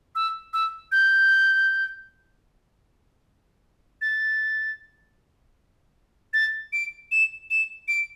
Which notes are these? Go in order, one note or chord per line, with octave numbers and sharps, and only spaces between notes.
E6
E6
G6
A6
A6
D7
E7
E7
D7